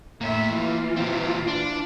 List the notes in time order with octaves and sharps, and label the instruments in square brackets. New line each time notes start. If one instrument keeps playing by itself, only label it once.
[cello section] A2 E5 [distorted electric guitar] A#3 C#5
[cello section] E3 F4
[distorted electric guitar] A#2 C4
D4